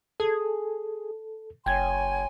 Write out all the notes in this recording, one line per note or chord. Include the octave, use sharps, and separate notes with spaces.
G#4 A4
F#1 C#5 G5 G#5 C6 G#6